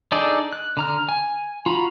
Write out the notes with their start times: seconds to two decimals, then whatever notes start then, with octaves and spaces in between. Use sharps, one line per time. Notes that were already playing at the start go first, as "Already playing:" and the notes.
0.12 D4 D#4 G#4 A4 D5
0.53 F#6
0.77 D3 A#5 F6
1.09 G#5
1.66 F4 F#4 A#5 B5